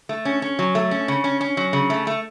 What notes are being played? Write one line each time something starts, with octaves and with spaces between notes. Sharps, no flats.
A3
C#4
C#4
F#3
A3
C#4
C#3
C#4
C#4
F#3
C#3
A3
A3